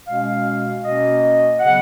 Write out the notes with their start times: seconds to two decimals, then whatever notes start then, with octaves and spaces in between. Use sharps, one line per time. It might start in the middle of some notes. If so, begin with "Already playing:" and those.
0.07 B2 G#3 C#4 F5
0.83 B2 A#3 C#4 D#5
1.59 C#3 F#3 B3 F#5